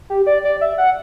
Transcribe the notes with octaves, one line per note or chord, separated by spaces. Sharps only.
G4
D5
D5
E5
F#5